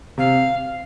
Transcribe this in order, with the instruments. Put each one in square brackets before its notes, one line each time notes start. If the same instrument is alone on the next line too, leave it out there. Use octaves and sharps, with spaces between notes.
[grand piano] C3 [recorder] F5